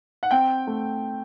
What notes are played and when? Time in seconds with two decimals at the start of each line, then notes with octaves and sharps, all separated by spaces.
0.23 F#5
0.31 C4 G5
0.67 A3